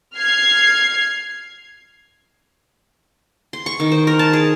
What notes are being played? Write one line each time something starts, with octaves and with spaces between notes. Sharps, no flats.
F6 G#6 C7
C6
C#6
D#3
C5
A#4
A5
G#4